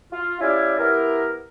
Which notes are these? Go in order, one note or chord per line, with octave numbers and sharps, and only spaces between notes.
F4
C#4 E4 G4 D5 F5 G#5
B3 E4 G4 A#4